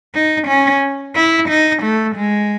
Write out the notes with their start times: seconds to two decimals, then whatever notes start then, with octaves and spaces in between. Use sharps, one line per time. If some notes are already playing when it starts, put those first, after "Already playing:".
0.14 D#4
0.48 C#4
1.16 E4
1.49 D#4
1.83 A3
2.16 G#3